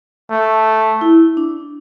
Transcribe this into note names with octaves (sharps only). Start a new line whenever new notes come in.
A3
E4
D4